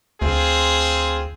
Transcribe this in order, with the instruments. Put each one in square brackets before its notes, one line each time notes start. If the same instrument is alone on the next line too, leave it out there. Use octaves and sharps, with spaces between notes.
[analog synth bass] D2 [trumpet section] C4 F4 G#4